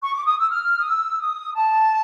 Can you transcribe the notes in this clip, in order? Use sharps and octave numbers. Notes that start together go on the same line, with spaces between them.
C#6
D6
D#6
E6
F6
D#6
E6
D#6
A5